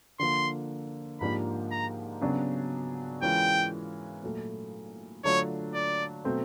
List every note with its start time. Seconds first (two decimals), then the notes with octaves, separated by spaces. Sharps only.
0.19 D3 F3 A#3 C6
1.20 G#2 F3 A#3 D4 G4 B5
1.71 A#5
2.21 C#3 F#3 B3 D4 F#4
3.22 E3 G#3 C#4 F4 A#4 G5
4.23 A#2 F#3 A3
5.24 D3 F#3 A3 D4 F4 C#5
5.74 D5
6.25 B2 F#3 A3 C4